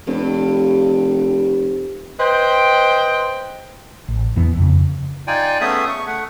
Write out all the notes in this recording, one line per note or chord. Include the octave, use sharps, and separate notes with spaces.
F1 G2
B4 C5 D#5 G5
A1
E2 E3 B3
F2 C#3
D#4 F4 D5 G5 G#5
A3 B3 C#4 G#4 E5 D#6
C#6
A3 F#5